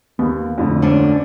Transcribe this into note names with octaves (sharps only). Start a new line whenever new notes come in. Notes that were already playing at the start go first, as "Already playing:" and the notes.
D#2 B3
F2 A2 D3
D2 C#4 D4